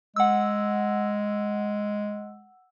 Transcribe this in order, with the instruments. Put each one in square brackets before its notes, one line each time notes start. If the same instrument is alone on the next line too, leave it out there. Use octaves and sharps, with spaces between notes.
[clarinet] G#3 [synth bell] F#5 E6